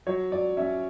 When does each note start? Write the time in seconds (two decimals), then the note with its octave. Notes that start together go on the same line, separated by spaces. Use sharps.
0.07 F#3 C#5
0.31 F#3 D5
0.57 C#4 E5